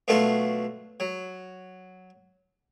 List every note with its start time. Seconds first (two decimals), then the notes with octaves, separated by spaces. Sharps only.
0.08 B2 F#3 A3 D4 F4 A4
1.00 F#3